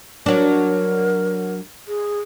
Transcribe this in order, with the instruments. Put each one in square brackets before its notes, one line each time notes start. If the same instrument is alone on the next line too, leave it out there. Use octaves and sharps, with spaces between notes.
[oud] F#3 D4 [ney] A#4
[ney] G#4